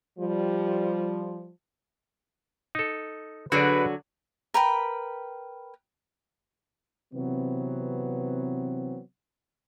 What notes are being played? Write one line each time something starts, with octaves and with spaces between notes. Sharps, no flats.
F3 G3
D#4 A4
D3 F#3 F#4 G#4 B4 D5
A#4 B4 G5 B5
C3 E3 F#3 B3 C4